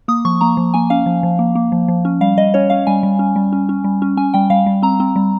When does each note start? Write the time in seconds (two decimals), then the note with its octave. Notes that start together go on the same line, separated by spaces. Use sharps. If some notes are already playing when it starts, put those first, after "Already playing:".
0.08 A#3 D#6
0.25 F3 C#6
0.41 A#3 A#5
0.57 F3
0.74 A#3 G#5
0.90 C#4 F5
1.06 F3
1.23 F3
1.39 A#3
1.55 A#3
1.72 F3
1.88 F3
2.05 C#4
2.21 G3 F5
2.37 G3 D#5
2.54 C#4 C#5
2.70 C#4 F5
2.87 G3 G#5
3.03 G3
3.19 C#4
3.36 G3
3.53 C#4
3.69 C#4
3.84 G3
4.02 C#4
4.17 C#4 G#5
4.34 G3 G5
4.50 G3 F5
4.66 G3
4.82 C4 A#5
5.00 C4
5.16 G3